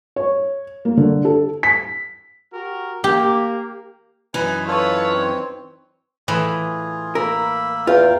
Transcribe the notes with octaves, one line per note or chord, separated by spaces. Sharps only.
C#5
A#3
D3
A4
B6
F#4 G4 A#4
A#3 G4
F#2 E3 D#4 B4 G#5
F4 A4 B4 C#5
C4
A2 E3 F4 G#4
A#3 A#4 B5 E6
E2 F4 A#4 G5